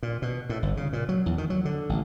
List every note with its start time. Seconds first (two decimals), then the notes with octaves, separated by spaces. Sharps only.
0.03 A#2
0.22 B2
0.49 A2
0.63 G1
0.77 C#3
0.93 A#2
1.09 F#3
1.26 E2
1.38 D#3
1.50 F#3
1.65 D3
1.89 A1